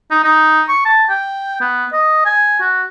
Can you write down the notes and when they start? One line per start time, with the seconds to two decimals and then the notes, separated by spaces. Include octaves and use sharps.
0.11 D#4
0.24 D#4
0.68 C#6
0.85 A5
1.09 G5
1.61 B3
1.92 D#5
2.25 G#5
2.60 F#4